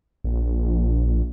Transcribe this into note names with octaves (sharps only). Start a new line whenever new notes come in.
A#1